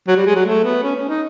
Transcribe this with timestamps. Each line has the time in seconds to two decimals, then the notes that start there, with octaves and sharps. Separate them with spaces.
0.08 F#3
0.16 G3
0.26 G#3
0.35 F#3
0.45 A3
0.64 B3
0.84 C#4
0.96 C#4
1.08 D#4